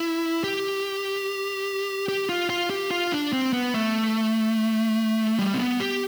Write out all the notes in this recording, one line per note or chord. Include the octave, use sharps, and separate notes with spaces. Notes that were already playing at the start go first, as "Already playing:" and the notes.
Already playing: E4
G4
G4
F4
F4
G4
F4
D4
C4
B3
A3
G3
C4
B3
G4